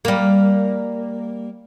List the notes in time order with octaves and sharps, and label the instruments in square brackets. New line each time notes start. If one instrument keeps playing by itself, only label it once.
[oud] G3 A#3